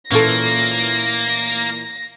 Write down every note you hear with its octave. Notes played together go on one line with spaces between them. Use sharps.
A#2 E3 A#3 C#4 F4 A4 A#6